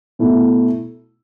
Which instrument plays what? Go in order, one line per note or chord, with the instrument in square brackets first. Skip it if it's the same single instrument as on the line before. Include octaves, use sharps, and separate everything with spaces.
[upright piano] B2 A3 E4